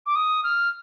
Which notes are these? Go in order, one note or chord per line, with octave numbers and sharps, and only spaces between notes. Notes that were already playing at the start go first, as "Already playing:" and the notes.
D6
D#6
F6